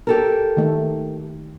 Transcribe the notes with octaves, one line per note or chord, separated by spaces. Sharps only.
G4 A4 A#4
D#3 A3